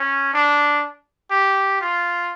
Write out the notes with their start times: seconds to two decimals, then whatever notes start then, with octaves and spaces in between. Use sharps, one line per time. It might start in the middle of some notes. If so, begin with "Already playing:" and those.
Already playing: C#4
0.33 D4
1.31 G4
1.81 F4